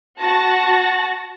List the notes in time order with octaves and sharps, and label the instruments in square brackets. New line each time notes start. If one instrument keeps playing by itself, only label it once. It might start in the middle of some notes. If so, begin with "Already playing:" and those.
[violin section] F#4 A5 A#6